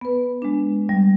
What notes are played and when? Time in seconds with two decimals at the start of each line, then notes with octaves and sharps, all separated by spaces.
0.01 B3 B4
0.42 G#3 D4
0.89 G3